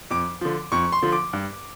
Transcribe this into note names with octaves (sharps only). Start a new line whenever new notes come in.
F2 D6
D3 F3
F2 C#6
C6
D3 F3
D6
G2